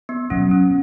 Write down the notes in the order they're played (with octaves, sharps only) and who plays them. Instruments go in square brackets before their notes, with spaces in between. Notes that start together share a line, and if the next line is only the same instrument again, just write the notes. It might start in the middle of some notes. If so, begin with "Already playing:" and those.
[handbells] B3
[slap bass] B2 F#3 B3 [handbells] C#4
[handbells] C#4